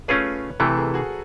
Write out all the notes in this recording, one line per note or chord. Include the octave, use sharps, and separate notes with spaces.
A3 C#4 F4 G#4 B4 C#5
C3 E3 A3 A4 B4
G#4 A#4
F#4 G#4